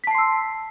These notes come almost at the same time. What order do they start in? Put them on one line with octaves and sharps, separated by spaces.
B6 A5 C7 C6 E6